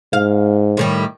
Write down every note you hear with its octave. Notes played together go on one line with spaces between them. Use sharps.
G#2 F5
A2 D#3 G3